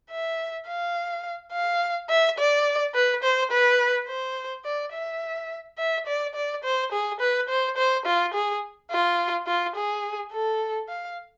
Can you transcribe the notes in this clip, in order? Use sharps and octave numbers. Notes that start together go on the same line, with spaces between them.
E5
F5
F5
E5
D5
B4
C5
B4
C5
D5
E5
E5
D5
D5
C5
G#4
B4
C5
C5
F4
G#4
F4
F4
G#4
A4
F5